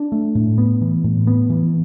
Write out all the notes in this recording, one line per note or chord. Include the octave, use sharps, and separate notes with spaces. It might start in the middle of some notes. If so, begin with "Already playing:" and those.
Already playing: D4
A3
A2
B3
E3
A2
B3
E3